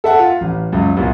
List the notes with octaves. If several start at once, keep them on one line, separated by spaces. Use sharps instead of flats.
A4 E5 F#5
F4
A1
C#2 F#2
C2 A#2